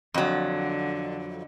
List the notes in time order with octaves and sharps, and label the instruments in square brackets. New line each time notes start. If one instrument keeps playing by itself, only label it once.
[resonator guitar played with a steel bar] F2 F#3 [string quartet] D3